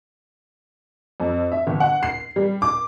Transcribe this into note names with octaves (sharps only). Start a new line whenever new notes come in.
F2
E5
G1
F#5
C7
G3
D6